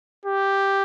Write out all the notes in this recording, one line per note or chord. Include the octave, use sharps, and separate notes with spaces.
G4